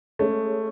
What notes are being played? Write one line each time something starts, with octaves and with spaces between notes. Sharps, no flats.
G#3 A3 C#4 G#4 C#5